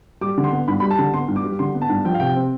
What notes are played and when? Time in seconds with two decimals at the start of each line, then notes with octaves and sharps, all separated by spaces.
0.21 G3 D6
0.37 D3
0.44 C6
0.52 B3
0.68 G2 B5
0.80 G3 B5
0.91 A5
0.99 D3
1.13 B3 C6
1.28 G2
1.36 D6
1.44 G3
1.59 D3 C6
1.75 B3
1.82 A5
1.89 G2
2.05 F3 G5
2.14 F5
2.20 C3 G5
2.36 C4